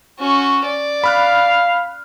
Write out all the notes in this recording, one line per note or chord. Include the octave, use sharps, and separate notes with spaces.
C#4 F#4
D5
F5 B5 F6 F#6